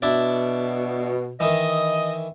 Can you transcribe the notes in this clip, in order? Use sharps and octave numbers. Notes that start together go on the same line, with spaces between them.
B2 D4 E4 D5
D#3 E3 D#5